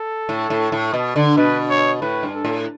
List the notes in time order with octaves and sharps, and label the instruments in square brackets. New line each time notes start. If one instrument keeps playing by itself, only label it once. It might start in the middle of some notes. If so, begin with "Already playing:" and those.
Already playing: [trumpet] A4
[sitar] A2
A2
A2
B2
D3
[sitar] B2 [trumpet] B4
[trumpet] C#5
[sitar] A2 [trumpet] B4
[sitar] G2
[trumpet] A4
[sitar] A2